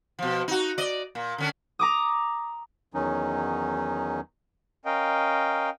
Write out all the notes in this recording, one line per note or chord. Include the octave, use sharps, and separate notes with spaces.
B2 F3
D#4 F#4
D5 D#5
A#2
D3 C#4 D4
A#5 D6 D#6
E2 D#3 F#3 C#4 D#4
C#4 A#4 D#5 F5 G5